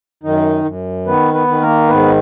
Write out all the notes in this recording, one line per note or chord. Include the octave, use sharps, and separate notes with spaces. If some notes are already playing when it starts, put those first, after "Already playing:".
F#2 D#3 D#4
F#2
D#3 B3 B4
B3 B4
D#3
A#3 A#4
G#2 B3 B4